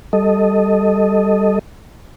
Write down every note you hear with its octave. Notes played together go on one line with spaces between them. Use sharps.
G3 A4 D#5